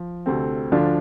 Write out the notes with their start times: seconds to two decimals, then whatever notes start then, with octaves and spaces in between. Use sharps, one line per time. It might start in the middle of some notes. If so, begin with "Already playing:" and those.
Already playing: F3
0.26 D2 C3 A3 C4
0.72 D2 D3 F3 D4 F4